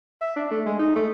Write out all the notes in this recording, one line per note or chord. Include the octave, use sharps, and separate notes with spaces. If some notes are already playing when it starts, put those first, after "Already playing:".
E5
D4
A3
G#3
D#4
A3